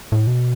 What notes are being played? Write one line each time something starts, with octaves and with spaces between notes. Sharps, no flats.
A2
B2